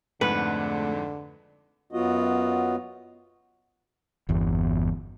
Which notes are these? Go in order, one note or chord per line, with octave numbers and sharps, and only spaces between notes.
F2 G#2 D3 G#3 A3 B4 F#5
F#2 F#3 B3 F4 F#4 D#5
G1 E2